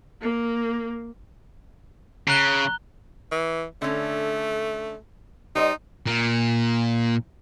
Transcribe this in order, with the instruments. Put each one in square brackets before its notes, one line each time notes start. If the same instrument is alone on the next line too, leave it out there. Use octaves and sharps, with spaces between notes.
[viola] A#3
[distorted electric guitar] C#3 [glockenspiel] A#5 F#6 G7
[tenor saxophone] E3
[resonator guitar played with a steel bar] D3 C#4 [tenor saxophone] A3
[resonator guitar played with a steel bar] G3 C5 D#5 [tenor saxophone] D#4
[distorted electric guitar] A#2